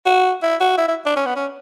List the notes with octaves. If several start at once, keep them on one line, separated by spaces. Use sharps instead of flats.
F#4
E4
F#4
E4
E4
D4
C#4
B3
C#4